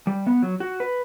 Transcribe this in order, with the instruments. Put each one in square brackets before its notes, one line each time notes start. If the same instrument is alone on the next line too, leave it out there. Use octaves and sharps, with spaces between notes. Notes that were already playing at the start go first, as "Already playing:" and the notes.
[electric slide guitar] G3
B3
F#3
F#4
B4